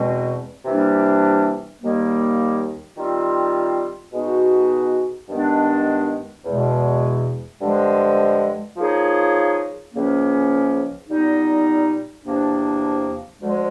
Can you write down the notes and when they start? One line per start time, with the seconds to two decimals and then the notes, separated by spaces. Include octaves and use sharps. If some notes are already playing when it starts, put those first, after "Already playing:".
Already playing: E2 B2 G#3 C4
0.65 C3 E3 G3 A#3 D4
1.81 D#2 D#3 G3 A#3
2.97 D#3 G3 C4 F4
4.13 B2 G#3 B3 D#4 F#4
5.28 G2 D#3 G#3 B3 D4
6.45 E2 B2 G#3
7.61 G2 D3 F3 G#3
8.77 F3 A#3 D#4 G#4 C#5
9.93 C#2 C#3 F3 A#3 C#4
11.08 A#2 G3 B3 D#4
12.24 E2 C3 F3 A#3 D4
13.41 D2 D3 F3 G#3